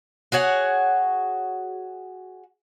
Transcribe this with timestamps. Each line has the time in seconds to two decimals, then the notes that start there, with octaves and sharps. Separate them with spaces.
0.32 F#4 G#4 C#5 F#5